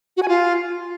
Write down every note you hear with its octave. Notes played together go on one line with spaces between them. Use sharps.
F#4
G#5
F4